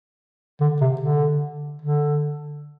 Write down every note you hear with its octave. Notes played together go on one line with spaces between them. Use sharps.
D3
C3
D3
D3